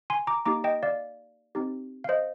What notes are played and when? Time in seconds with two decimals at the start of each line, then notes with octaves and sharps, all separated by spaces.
0.10 G#5 C6
0.27 A#5 D6
0.46 A#3 D#4 G4 A#5 D6
0.64 D#5 G5
0.83 D5 F5
1.55 C4 D#4 G4
2.04 F5
2.09 C5 D#5